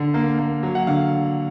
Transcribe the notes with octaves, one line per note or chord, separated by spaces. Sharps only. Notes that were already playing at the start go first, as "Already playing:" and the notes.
Already playing: D3
A#3
A#3
F#3
F#5
D3 F5